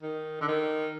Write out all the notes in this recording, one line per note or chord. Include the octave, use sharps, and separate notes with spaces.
D#3
D3
D#3